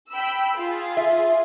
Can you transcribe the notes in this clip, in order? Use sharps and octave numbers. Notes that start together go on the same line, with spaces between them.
G5 B5 E6
F4 G#4
E5